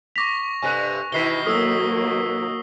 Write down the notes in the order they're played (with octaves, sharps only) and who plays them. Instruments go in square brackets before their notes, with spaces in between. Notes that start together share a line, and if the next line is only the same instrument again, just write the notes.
[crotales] C#6 A#6 F7 [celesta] D6 B6
[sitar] G2 C3 A3 [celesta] G#5 F#6
[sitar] B2 D#3 E3 [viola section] E4 [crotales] B6 C7 G7
[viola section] F#3 A#3 [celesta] A4 [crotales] D#6 E6 G7